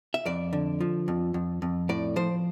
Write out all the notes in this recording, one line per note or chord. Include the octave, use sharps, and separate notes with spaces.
E5
F2 D5
D3
F3
F2
F2
F2
A2 D5
F3 C5